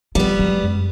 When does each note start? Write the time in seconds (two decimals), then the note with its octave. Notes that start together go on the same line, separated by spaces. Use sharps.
0.15 F3 G3 B3
0.39 F#3 G#3
0.64 F#2